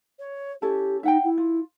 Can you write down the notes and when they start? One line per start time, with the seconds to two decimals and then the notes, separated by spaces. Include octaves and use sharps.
0.20 C#5
0.62 C#4 E4 G4 A4
1.03 D#4 E5 F#5 G5
1.24 E4
1.38 F4